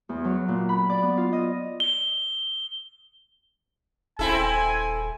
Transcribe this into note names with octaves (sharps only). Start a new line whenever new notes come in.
E2
F#3
A#2
B5
D5
B3
F4
D#5
G7
D#1 C4 E4 A4 G#5